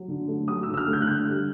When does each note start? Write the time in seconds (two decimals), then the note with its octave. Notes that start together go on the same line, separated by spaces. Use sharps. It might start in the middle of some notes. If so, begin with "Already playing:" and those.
Already playing: F#3
0.08 D3
0.28 A3
0.48 F#3 D#6
0.63 E6
0.68 D3
0.74 E6
0.77 F6
0.87 A3
0.93 G6
1.02 F#6
1.07 D3 G6
1.27 G3